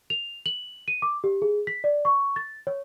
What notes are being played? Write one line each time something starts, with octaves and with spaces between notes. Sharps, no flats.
F7
F#7
D#7
D6
G4
G#4
B6
D5
C#6
A6
C#5